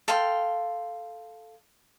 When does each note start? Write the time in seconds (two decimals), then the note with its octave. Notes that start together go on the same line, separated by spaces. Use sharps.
0.08 A4 F5 G5 C6